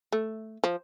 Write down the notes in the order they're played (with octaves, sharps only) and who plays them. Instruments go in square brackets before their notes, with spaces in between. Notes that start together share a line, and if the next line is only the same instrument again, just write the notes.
[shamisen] A3
F3